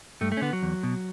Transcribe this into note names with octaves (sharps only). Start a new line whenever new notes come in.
G2 A3
A3
C#4
D3 B3
F#3
E2
B2